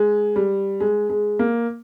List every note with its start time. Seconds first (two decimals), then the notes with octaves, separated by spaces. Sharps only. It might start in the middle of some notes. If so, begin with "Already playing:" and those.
Already playing: G#3
0.36 G3
0.80 G#3
1.10 G#3
1.39 A#3